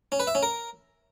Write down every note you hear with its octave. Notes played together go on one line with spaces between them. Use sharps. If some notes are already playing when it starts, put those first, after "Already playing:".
C#4
B4
E5
C#4
A#4